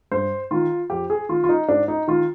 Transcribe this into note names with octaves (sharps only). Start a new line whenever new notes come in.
G2 C5
D#3 F4
F2 G4
G#4
D#3 F4
F4
D#4
G#2 D4
D#4
D#3 F4